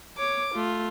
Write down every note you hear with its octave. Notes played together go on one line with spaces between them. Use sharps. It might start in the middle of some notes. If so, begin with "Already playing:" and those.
C#5 D6
A3 F4